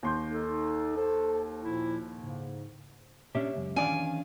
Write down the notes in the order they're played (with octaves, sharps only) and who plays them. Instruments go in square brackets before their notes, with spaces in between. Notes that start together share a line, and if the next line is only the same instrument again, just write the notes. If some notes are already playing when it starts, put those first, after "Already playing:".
[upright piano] D#2 C6 G6
[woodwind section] D#4 A4
A4 C5
A#2 F3 E4
G#2 C#3
[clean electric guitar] A#2 C#4 D4 [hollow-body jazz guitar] G4 C#5 E5
[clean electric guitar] C#2 F#2
[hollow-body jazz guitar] E2 D#3 D5 [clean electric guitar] C#4 D4 F5 [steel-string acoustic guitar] G#5